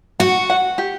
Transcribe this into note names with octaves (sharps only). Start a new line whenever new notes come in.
F#4 F#5
F#5
G4